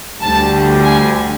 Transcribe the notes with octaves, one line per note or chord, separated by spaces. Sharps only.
D2 D3 G3 A5
G#5